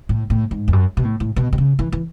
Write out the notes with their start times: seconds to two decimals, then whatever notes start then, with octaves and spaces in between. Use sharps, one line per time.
0.09 A2
0.30 A2
0.51 G#2
0.68 E2
0.73 F#2
0.97 B2
1.05 A2
1.20 A2
1.36 B2
1.53 B2
1.58 C#3
1.79 E3
1.92 E3